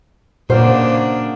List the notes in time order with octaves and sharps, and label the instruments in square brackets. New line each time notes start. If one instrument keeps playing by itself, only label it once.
[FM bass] A#2 [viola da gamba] C#3 A#3 D4 [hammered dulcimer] F#3 F5 [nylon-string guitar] C5